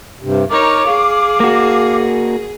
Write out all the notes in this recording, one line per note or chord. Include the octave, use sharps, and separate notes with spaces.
G2 C3
D#4 A#4 C#5 D6
G#4 F5
A#3 F#4